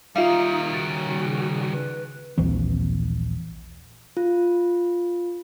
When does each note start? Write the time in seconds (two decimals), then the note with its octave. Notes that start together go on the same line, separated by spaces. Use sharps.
0.16 D#3 G3 D#4 F4 E5 F5
0.74 C#3 F#4 A6 D7
1.72 B4
2.38 D#1 A#1 E3 C4
4.17 F4